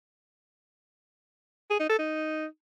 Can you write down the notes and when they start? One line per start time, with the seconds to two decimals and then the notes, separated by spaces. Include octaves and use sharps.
1.70 G#4
1.80 D#4
1.89 A4
1.99 D#4